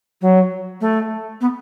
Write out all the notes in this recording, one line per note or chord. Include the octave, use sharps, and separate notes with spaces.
F#3
A3
B3